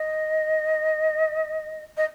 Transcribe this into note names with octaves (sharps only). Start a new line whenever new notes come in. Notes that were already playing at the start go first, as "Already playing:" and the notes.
Already playing: D#5
D#5